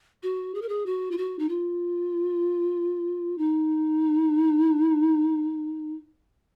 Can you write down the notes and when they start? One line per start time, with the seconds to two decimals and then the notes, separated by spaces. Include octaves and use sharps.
0.23 F#4
0.55 G#4
0.62 A#4
0.69 G#4
0.86 F#4
1.11 F4
1.18 F#4
1.39 D#4
1.49 F4
3.38 D#4